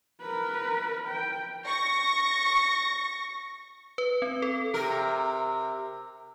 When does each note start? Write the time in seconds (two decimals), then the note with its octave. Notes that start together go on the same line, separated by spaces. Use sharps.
0.22 A#4 B4
1.08 G5
1.66 C#6 A#6
3.98 B4
4.22 C4
4.42 A4
4.74 C3 A#4